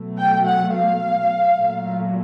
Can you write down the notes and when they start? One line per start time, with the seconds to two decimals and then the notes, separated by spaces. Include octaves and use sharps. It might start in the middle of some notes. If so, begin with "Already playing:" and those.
Already playing: B2 F#3 A3
0.18 G5
0.45 F#5
0.74 F5
1.58 A#2 F#3 A3